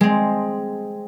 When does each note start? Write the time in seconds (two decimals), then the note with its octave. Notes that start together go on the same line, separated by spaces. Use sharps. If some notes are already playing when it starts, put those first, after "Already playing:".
0.01 G#3 C4